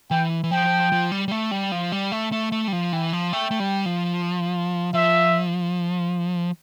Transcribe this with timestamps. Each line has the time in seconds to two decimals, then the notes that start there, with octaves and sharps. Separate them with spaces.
0.11 E3 G5
0.44 E3
0.51 F3 G5
0.92 F3
1.12 G3
1.28 G3
1.31 A3
1.51 G3
1.72 F3
1.92 G3
2.12 A3
2.32 A3
2.52 A3 E5
2.68 G3
2.73 F3
2.93 E3 G5
3.13 F3
3.32 A3 G5
3.51 A3
3.60 G3
3.86 F3
4.93 F3 E5